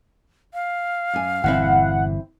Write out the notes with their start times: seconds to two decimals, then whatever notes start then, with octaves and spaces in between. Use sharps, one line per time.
0.54 F5
1.14 F#2 G#5
1.44 G1 A#2 E3 C4 E4 F#5